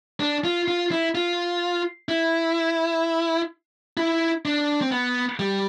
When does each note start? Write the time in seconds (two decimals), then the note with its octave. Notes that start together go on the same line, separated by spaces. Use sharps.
0.20 D4
0.44 F4
0.68 F4
0.91 E4
1.15 F4
2.09 E4
3.97 E4
4.45 D4
4.81 C4
4.92 B3
5.39 G3